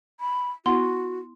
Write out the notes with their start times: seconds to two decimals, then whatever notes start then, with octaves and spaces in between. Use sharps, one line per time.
0.20 B5
0.66 B3 E4 F#4 F#5 C6